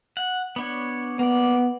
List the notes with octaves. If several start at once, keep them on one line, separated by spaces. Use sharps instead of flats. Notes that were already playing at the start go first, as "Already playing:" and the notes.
F#5
B3 D4 C#5
A#3 B3 D5